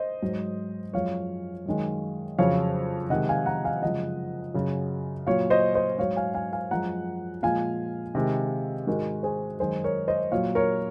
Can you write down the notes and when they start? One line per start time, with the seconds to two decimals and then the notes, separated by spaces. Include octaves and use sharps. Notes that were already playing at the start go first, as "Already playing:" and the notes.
Already playing: C5 D#5
0.23 G#2 F#3
0.93 F#2 F3 G#3 C#5 F5
1.66 F#2 D#3 G#3
2.39 F2 C#3 F#3 C#5 F5
3.10 C3 D#3 G#3 D#5 F#5
3.29 F5 G#5
3.46 F#5 A#5
3.65 F5 G#5
3.82 F#2 C#3 F3 G#3 D#5 F#5
4.54 F#2 C#3 F#3
5.27 A#2 F#3 C#5 F5
5.50 C5 D#5
5.75 C5 D#5
5.98 G#2 F#3 C#5 F5
6.16 F5 G#5
6.34 F5 G#5
6.53 F5 G#5
6.71 F#2 F3 G#3 F#5 A#5
7.43 A#2 F3 G#3 F5 G#5
8.15 C3 D#3 G#3
8.87 G#2 D#3 G#3 F#4 A#4
9.23 G#4 C5
9.60 F#2 D#3 G#3 G#4 C5
9.84 A#4 C#5
10.08 C5 D#5
10.31 A#2 F#3 C#5 F5
10.55 A#4 C#5